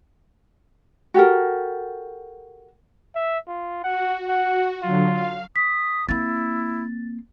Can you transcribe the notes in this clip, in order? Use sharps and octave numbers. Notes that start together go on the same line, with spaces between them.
F#4 G4 A4 A#4
E5
F4
F#4 F#5
F#5
D3 F#3 F4
F5
D#6 B6
A#3 C4 E4 A6